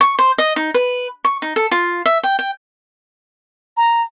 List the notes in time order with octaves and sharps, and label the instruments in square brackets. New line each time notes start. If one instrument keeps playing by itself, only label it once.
[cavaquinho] C#6
C5
D#5
D#4
B4
C#6
D#4
A4
F4
E5
G5
G5
[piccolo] A#5